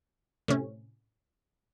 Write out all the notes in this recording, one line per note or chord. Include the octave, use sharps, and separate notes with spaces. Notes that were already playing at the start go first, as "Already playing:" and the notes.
A2 C3 C#4